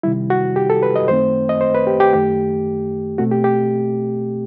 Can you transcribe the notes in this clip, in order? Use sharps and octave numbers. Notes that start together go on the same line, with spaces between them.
C3 D#3 G3 E4
F#4
G4
A4
B4
D#5
F#2 D#3 A3 C4 C5
D#5
C5
B4
G4
G4
F#2 D#3 A3 G4
B2 A3 C4 F#4
G4
G4